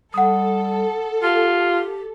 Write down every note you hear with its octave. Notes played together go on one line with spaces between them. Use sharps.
G3 A4 F#5 D#6
F4 G4